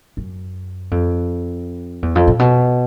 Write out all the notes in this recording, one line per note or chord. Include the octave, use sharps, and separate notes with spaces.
F#2
F2
E2
F2
A#2
B2